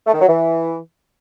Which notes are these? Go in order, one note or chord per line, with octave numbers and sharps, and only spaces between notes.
A3
D#3
F#3
E3